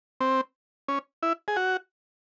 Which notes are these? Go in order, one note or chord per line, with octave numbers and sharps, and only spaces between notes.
C4
C#4
E4
G#4
F#4